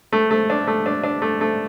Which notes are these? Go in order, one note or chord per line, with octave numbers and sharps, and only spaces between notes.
A3
A3
D4
A3
D4
D4
A3
A3